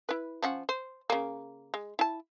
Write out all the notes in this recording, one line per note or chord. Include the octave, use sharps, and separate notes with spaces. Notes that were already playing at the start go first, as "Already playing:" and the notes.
E4 B4
F3 C#4 F#5
C5
C#3 A#3
G#3
E4 A5